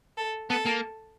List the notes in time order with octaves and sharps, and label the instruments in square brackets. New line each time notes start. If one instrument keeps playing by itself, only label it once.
[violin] A4
[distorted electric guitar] B3 [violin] A4
[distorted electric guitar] A#3